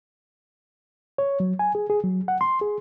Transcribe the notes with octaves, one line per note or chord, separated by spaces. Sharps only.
C#5
F#3
G#5
G#4
G#4
F#3
F#5
C6
G#4